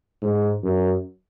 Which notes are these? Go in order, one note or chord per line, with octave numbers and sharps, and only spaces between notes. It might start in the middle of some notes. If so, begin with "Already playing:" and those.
G#2
F#2